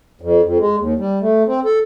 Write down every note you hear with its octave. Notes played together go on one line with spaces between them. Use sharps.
F2
F2
G#3
D#2
G3
A3
C4
A4